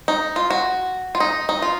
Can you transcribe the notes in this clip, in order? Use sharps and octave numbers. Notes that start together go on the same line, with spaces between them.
D#4
F4
F#4
F4
D#4
D#4
F4